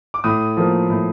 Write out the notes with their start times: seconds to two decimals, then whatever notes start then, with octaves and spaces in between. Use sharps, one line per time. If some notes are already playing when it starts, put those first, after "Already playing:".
0.14 D6
0.24 A2 D#6
0.57 F3 A#3
0.90 A2